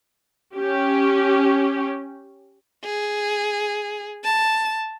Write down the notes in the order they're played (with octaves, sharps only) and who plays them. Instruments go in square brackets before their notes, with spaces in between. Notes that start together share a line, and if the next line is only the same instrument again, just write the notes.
[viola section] C#4 G4
[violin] G#4
A5